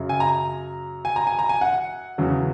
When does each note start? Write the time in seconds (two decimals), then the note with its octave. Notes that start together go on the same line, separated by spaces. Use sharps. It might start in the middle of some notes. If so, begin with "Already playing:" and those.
Already playing: F#2 C#3 F#3
0.09 G#5
0.20 A#5
1.05 G#5
1.16 A#5
1.27 G#5
1.39 A#5
1.49 G#5
1.61 F#5
2.18 E2 C#3 F#3